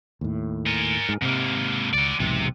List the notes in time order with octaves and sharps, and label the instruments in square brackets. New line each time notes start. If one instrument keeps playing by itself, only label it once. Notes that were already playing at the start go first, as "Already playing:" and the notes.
[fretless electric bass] D#2 A2
[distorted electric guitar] A#4 G#5
[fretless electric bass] G#2
[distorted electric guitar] G#2 A#3 [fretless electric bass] C3
[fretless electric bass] C#2 [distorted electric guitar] F#4 D5
[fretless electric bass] B1 E2 G#2 [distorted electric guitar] C3